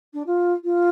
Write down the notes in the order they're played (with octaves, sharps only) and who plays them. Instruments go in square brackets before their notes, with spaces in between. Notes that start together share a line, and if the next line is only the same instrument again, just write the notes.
[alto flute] D4
F4
F4